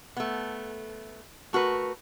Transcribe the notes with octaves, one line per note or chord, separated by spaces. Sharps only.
A3 B3
A3 F#4 A#4 B4